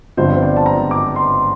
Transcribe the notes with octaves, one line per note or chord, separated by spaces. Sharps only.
G1 G2 F3 C4 C5
C5
D5
A5
A#5
D6
C6